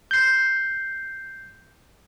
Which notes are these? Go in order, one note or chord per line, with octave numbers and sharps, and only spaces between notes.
G6 C7